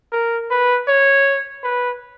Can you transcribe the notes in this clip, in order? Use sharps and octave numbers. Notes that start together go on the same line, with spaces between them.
A#4
B4
C#5
B4